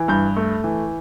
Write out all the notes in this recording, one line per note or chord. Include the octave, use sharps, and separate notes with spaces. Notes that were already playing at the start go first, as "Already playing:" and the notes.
Already playing: E3
G2 G6
A3
E3